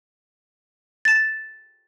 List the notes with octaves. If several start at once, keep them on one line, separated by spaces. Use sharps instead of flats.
A6 E7